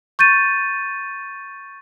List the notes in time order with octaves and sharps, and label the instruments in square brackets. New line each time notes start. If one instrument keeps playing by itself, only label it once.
[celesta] C#6 G6 A6 D#7